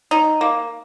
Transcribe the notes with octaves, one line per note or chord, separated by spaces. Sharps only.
D#4
A#3